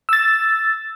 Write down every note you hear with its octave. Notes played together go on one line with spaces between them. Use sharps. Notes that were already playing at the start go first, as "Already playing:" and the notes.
E6 A6